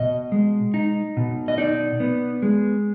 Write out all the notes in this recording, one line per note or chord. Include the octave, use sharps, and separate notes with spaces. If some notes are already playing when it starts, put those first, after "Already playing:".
Already playing: B2 D#5
G#3
D#4
B2
D#5
D#4 D5
B3
G#3